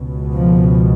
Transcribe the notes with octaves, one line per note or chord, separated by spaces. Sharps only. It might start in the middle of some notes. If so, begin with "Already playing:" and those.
Already playing: C#2 B2
F3